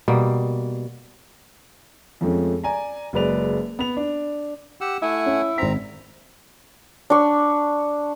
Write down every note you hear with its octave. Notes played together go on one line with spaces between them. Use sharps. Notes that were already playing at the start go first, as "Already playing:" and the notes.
B2 G3 A#3
F2 F3 G#3 A3 C#4
D5 G#5 A#5
F#1 F#3 G#3 B4 D5 F7
B3 F7
D4
G4 F#5 E6
A3 E4 F#5 G#5
C#4
G#1 C4 A#5 B6
D4 C#6